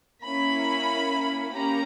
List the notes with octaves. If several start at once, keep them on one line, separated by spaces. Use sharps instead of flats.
A#3 C#4 E4 B5
A#3 C#4 G4 A#5